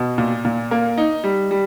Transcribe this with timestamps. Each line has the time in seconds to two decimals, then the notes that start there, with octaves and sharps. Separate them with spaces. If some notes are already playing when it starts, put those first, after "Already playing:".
Already playing: B2
0.18 A#2
0.45 A#2
0.71 A#3
0.98 D#4
1.24 G3
1.51 G3